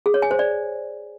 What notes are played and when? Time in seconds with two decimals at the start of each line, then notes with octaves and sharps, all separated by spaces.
0.06 G#4
0.14 C#5
0.22 G#5
0.31 C5
0.39 D5